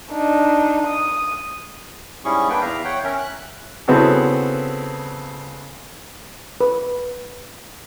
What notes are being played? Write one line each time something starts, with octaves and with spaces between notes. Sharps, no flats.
D4 D#4
D#6
G#2 G3 C#4 E4 G#4 C#6
A#3 B3 D4 B4 G5
E2 E5 F5 A#5
C#5 F#5 G5
C#4 A#4 E5
F#6
C#3 B3 C4 E4 F#4 A4
B4